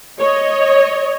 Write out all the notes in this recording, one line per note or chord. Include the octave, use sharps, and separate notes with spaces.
C#5 D#5